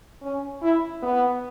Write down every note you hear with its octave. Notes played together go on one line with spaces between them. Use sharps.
C#4
E4
B3